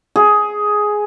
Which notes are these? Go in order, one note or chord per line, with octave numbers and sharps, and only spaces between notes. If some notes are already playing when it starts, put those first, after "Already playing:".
G#4